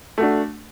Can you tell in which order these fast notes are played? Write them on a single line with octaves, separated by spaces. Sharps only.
A3 F#4 D4